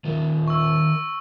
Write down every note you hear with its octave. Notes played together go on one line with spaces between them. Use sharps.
D#3 F4 A#4
C#6 E6